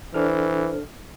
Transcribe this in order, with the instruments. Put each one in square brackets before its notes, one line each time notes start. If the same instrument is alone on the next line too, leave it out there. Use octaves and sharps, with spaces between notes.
[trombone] E3 [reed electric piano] D4 A4 F6 [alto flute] C5